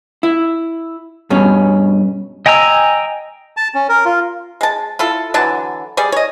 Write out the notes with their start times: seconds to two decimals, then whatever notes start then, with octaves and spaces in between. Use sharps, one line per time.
0.23 E4
1.30 G2 B2 C#4
2.46 D#5 G5 G#5 A#5 E6
3.57 A5
3.74 C#4
3.89 A#4
4.05 F4
4.61 G#3 A5
4.99 E4 F4 A4
5.34 D3 E3 F#3 A5
5.97 G3 G#4 D5
6.12 C#5 D#5